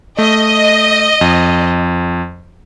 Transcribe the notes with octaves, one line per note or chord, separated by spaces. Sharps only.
A3 D#5
F2